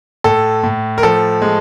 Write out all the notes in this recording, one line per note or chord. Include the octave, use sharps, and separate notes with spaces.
A2 A4
A2
A#4
F3 A4
G#3